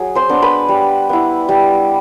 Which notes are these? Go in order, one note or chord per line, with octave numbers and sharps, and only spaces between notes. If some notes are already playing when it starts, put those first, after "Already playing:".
Already playing: F#3 G#4
C5 C6
B3 D4
B4 B5
G3
B3 E4
G3